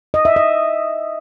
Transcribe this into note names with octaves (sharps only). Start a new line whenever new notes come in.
D#5
E5
D#5